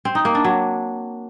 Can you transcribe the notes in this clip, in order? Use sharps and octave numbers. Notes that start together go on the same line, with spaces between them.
C4
D#4
A#3
D4
F#3